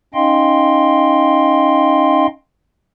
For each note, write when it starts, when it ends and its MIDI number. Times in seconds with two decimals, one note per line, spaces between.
0.14 2.26 61
0.14 2.26 63
0.14 2.26 75
0.14 2.26 77
0.14 2.26 79
0.14 2.26 84